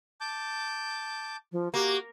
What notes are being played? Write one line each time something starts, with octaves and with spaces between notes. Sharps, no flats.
A5 D6 G6
F3
A#3 F#4 G4